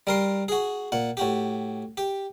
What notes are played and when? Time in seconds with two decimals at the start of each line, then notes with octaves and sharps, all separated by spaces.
0.07 G3 A#4 C6
0.48 F#4 G#4
0.92 A#2 F#5
1.17 A2 F#4 G4
1.97 G4